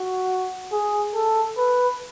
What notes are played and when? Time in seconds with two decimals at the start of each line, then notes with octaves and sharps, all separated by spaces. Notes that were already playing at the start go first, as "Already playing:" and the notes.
Already playing: F#4
0.72 G#4
1.15 A4
1.58 B4